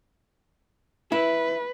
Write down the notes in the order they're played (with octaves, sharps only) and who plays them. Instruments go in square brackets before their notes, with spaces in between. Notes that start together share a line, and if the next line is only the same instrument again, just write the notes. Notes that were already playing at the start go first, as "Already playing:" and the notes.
[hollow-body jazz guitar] E4 [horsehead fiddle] B4